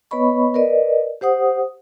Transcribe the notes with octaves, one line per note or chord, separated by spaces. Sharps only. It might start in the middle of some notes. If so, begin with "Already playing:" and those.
B3 B4 C#5 D#5 B5 C#6
A#4 B4 D5 D#5
G4 C5 F#5 D#6